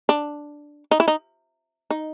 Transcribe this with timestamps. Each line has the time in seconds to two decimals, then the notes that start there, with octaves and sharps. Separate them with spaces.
0.09 D4
0.91 D#4
1.00 E4
1.08 D#4
1.90 D#4